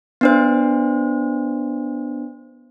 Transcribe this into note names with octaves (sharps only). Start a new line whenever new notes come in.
B3 D4 C5